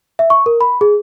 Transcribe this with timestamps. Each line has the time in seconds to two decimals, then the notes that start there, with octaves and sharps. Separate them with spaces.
0.19 E5
0.30 C#6
0.46 A#4
0.61 B5
0.81 G#4